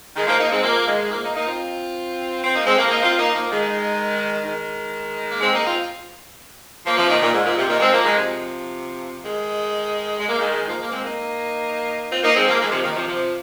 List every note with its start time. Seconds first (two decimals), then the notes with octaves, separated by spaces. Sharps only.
0.16 D#3 G#3
0.27 F3 A#3
0.39 A#3 D#4
0.52 G#3 C4
0.63 F3 A#3
0.87 D#3 G#3
1.11 F3 A#3
1.23 A#3 D#4
1.35 A#3 D#4
1.46 C4 F4
2.44 C4
2.54 A#3 D#4
2.66 G#3 C4
2.78 F3 A#3
2.90 A#3 D#4
3.03 C4 F4
3.18 A#3 D#4
3.34 F3 A#3
3.51 D#3 G#3
4.45 D#3 G#3
5.31 A#3
5.41 G#3 C4
5.53 A#3 D#4
5.65 C4 F4
6.85 F3 A#3
6.97 C3 F3
7.08 A#2 D#3
7.21 A#2
7.33 G#2
7.44 A#2
7.57 C3
7.68 A#2 D#3
7.80 G#3 C4
7.92 F3 A#3
8.04 D#3 G#3
8.16 C3 F3
9.24 D#3 G#3
10.20 G#3
10.29 A#3
10.39 D#3 G#3
10.68 F3 A#3
10.80 F3 A#3
10.91 G#3 C4
11.03 A#3 D#4
12.11 C4 F4
12.23 A#3 D#4
12.35 G#3 C4
12.48 F3 A#3
12.59 D#3 G#3
12.71 C3 F3
12.83 A#2 D#3
12.96 C3 F3
13.07 C3 F3